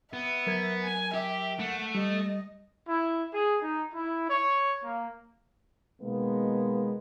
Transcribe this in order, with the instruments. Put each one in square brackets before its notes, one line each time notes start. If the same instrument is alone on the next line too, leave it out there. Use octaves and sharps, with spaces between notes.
[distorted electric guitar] B3 [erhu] E5
[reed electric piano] F#3 A#4 G#6
[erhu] G#5
[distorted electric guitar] G4 [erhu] E5
[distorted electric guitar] A3 [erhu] F#5
[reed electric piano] G3 [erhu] D#5
[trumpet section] E4
G#4
D#4
E4
C#5
A#3
[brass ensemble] B2 D#3 G#3 A#3 B3